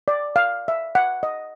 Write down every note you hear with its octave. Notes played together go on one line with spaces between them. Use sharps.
D5
F5
E5
F#5
D#5